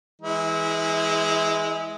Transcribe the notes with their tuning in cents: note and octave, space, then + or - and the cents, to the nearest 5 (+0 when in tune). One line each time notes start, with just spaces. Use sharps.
E3 +0 G#3 +0 E4 -30